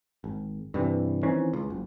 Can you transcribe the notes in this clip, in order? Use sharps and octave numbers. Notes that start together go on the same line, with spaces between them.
G#1
G2 C3 E3
D#3 E3 C4 C#4
C#2
F#1